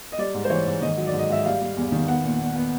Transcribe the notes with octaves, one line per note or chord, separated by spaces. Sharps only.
D#5
G3 D5
G#2
C5
E3 C#5
G#2
D#3 D#5
F#3
D5
G#2
D#5
G#2 E5
G3 F5
G3
E2
D#3
B3 F#5
A#2
A#2
B3